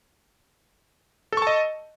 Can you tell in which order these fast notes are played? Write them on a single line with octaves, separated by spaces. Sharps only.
A4 C#6 A5 D#5